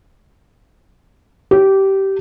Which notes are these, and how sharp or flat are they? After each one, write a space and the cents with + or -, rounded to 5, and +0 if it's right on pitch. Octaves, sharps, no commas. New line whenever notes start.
G4 -15